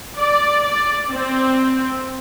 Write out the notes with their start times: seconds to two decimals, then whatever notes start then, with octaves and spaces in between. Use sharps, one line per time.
0.17 D5
0.66 D5
1.11 C4